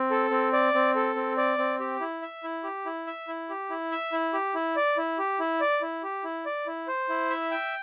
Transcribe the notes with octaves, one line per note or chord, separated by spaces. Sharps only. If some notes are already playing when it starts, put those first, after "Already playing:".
Already playing: C4
A4
C4
D5
C4
A4
C4
D5
C4
G4
E4
E5
E4
G4
E4
E5
E4
G4
E4
E5
E4
G4
E4
D5
E4
G4
E4
D5
E4
G4
E4
D5
E4
C5
E4
E5
G5